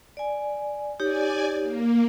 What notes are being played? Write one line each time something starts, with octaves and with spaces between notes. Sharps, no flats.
D5 G#5
D#4 G4 C#5 D5 G#5
A#3